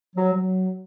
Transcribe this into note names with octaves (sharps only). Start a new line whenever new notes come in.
F#3
F#3